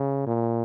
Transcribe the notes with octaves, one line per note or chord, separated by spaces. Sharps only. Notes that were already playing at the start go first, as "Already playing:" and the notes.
Already playing: C#3
A#2